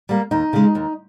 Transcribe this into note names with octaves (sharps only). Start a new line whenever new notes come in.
G3 A#3
D#2 D#4
C#3 G#3
D#2